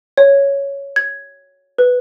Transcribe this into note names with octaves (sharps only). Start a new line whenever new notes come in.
C#5
G#6
B4